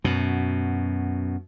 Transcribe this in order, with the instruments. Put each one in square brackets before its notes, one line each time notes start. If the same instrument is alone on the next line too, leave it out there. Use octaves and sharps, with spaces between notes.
[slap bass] F#2 B2